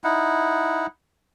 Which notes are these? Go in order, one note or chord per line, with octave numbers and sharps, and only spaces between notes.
D#4 E4 F#5